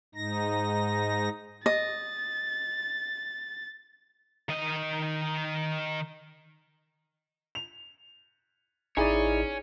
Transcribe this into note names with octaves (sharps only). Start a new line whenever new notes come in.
G#2 D#4 A#6
D#5 A6
D#3 D#5
F7
A1 D#4 E4 G#4 C#5 D5 G#5